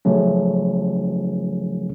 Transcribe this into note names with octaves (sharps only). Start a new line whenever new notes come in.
C#3 F3 F#3 A3 C#4